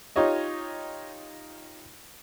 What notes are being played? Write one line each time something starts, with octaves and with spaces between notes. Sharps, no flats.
D#4 F4 G4 C#5 D#5